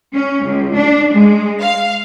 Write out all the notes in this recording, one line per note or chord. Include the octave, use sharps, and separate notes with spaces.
C#4
C#2
D4
G#3
F5